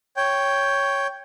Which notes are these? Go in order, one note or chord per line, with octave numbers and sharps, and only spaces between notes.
C#5 G5